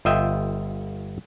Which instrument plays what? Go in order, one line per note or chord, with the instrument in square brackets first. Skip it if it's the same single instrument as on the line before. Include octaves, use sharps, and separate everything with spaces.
[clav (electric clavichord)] G1 F4 D#5 E5 G5